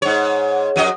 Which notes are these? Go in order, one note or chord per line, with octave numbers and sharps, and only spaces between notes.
G#2 C#5
F#2 F#3 D#5